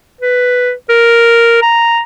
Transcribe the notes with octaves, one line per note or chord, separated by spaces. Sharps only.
B4
A#4
A#5